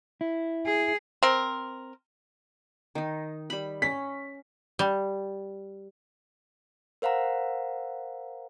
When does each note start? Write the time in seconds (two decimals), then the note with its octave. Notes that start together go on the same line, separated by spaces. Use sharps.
0.21 E4
0.66 G#4
1.23 C4 A#4
2.95 D#3 D#4
3.50 G3 B5
3.82 C#4 B6
4.79 G3
7.02 A#4 C5 F5 F#5 A#5